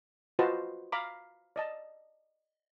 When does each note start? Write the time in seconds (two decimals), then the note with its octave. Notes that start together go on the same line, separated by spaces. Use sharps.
0.39 F4 F#4 B4 C5 D#5 A5
0.92 F5 A#5 B5 D6
1.56 D5 D#5 A5